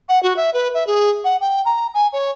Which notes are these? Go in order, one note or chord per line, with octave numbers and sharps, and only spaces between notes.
F#5
F#4
E5
B4
E5
G#4
F#5
G5
A#5
G#5
C#5